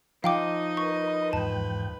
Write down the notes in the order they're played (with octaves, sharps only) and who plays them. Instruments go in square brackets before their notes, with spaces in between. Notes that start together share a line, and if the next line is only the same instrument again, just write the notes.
[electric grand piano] F3 [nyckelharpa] D#4 D#5 [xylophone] F5 G5 D6
[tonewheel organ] A#4 B4 [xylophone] C#6
[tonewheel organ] E2 G#2 G5 [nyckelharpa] B4 [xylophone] A5